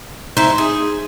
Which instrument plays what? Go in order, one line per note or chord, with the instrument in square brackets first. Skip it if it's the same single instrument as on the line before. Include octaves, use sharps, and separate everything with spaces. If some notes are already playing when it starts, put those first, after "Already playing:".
[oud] D#4 [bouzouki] E4 C5
[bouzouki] G#4